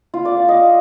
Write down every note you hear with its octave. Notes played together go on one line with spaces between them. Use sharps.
F4
D5
F5
D#5